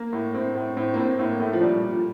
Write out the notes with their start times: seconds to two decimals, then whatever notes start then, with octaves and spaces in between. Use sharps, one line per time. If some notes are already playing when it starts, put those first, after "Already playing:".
Already playing: A#3
0.13 A2
0.34 A2 C4
0.56 A2
0.77 A2 C4
0.94 A#3
0.98 A2 C4
1.19 A2 A#3
1.40 A2 A3
1.53 F3
1.61 A#2 G3
1.82 A#2